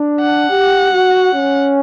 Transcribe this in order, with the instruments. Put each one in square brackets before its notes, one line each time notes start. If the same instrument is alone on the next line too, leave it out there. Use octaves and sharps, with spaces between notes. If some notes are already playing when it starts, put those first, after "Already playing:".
Already playing: [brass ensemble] D4
[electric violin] F#5
[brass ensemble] G4
F#4
C#4